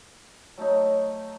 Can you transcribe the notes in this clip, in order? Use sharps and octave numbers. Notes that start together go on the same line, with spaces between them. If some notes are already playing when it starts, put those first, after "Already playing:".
F#3 A3 D#4